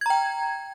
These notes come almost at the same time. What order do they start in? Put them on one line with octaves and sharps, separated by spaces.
G#6 A#5 G5